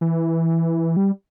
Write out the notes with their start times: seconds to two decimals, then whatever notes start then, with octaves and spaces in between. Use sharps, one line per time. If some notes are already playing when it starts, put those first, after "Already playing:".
0.01 E3
0.97 G3